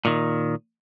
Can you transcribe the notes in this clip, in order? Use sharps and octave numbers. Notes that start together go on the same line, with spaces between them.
A#2 D#3